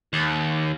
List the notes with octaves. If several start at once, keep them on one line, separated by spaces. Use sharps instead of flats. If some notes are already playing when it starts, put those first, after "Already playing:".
D#2